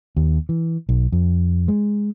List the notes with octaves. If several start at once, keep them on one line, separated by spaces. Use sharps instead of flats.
D#2
E3
B1
F2
G#3